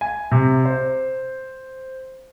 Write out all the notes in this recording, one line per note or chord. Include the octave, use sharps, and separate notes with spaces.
G#5
C3
C5